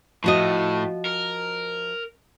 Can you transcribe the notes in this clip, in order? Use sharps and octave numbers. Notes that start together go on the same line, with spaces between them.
A2 F3 F#4 D#5
A#4